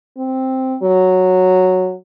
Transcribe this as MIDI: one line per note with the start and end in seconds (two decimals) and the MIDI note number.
0.18 0.77 60
0.83 1.95 54